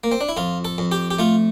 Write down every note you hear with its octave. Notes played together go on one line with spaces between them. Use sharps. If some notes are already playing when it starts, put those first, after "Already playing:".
A#3
C4
D4
E4
F2 F4
A4
F2
G4
G4
A3 F4